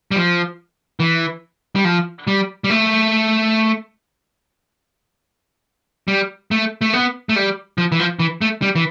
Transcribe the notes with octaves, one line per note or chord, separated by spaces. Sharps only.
G3
F3
E3
G3
F3
G3
G3
A3
G3
A3
A3
B3
A3
G3
F3
E3
F3
E3
A3
G3
E3